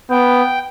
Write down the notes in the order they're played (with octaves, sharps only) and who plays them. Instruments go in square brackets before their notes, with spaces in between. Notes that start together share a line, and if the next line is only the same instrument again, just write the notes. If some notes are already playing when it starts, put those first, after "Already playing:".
[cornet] B3 [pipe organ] G5